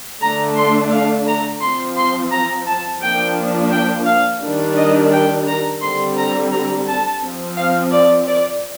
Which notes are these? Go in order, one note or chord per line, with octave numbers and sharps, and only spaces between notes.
D3 A3 D4 A#5
C6
F5
A#5
F3 C4 C6
C6
A#5
A5
F3 A#3 D4 G5
G5
F5
D#3 G3 D4
D#5
G5
A#5
D3 G3 C4 C6
A#5
A#5
A5
F3 C4
F5
D5
D5